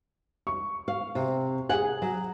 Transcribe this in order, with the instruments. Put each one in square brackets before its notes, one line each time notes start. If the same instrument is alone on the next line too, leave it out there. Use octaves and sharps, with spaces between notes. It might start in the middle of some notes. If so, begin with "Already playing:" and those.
[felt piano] C#6
[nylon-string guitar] F5
C3
[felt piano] G#4 G#5 [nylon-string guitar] F#5
[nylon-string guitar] F#3